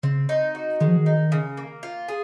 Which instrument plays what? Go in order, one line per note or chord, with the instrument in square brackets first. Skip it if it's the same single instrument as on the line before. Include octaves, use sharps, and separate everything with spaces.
[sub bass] C#3 [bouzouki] C4
[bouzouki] D#4
F#4
[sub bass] D#3 [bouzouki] G#3
[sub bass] F3
D#3
[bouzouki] D#4
C#3
A#3
F4
G#4